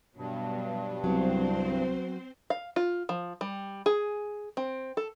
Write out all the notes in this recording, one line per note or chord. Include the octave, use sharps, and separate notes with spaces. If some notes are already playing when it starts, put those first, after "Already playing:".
G2 B2 F#3
C2 F#3 B3 C4 C5
F5
F4
F3
G3
G#4
C4
A4